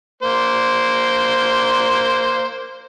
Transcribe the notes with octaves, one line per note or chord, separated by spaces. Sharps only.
A#3 C5